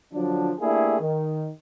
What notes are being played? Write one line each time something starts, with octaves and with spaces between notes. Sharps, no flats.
D3 F3 F#3 D4
A3 A#3 D4 E4 G4 G#4
D#3